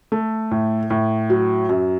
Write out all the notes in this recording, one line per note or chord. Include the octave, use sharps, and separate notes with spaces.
A3
A2
A2
F#3
F#2